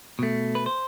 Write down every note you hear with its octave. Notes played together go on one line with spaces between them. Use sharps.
B2 A3
B4
C5